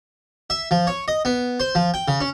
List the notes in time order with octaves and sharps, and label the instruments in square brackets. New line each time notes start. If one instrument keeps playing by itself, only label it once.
[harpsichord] E5
F3
C#5
D#5
B3
C5
F3
G5
C#3
C#4